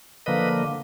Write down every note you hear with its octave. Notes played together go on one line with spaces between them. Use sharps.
D3 F3 A#3 B4 D#5